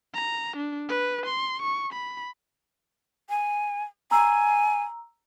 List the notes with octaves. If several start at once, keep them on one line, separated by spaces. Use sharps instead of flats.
A#5
D4
B4
C6
C#6
B5
G#5
G#5 A#5 E6